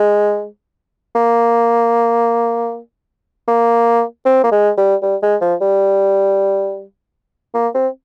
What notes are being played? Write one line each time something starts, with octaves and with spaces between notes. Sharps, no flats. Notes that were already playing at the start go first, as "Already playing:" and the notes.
Already playing: G#3
A#3
A#3
C4
A#3
G#3
G3
G3
G#3
F3
G3
A#3
C4